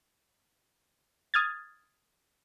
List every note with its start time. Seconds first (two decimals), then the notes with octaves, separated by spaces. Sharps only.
1.34 D#6 F6 G#6 A6